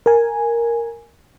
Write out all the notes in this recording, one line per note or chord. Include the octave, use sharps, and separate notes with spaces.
A#4 G#5